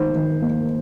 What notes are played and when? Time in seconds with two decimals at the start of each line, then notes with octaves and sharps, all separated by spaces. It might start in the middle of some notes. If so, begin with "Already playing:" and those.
Already playing: D#3 D#4 C5
0.15 D#3
0.42 A#3